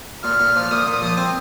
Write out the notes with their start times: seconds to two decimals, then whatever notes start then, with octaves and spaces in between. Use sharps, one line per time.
0.24 A#2 F6
0.39 A#2
0.56 F3
0.71 A#2 D#6
0.87 A#2
1.02 F3
1.17 C4